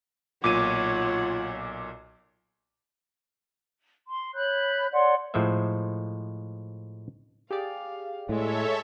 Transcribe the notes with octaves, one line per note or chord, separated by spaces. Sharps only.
B1 A#2 F4 C#5 F#5 D6 D#7
C6
C#5 B5 F#6 G6
C#5 D5 F#5 C6
A2 F3 G#3 C5 E5
G4 G#4 D5 F5
A2 G#3 A4 C#5 E5